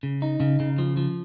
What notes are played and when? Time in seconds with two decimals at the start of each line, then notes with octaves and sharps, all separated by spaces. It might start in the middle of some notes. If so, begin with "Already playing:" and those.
0.03 C#3
0.22 D#4
0.40 C#3
0.60 C#3
0.78 F3
0.97 F3